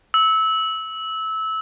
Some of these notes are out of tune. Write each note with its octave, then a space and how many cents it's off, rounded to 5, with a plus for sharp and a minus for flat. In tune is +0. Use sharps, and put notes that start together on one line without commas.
E6 -20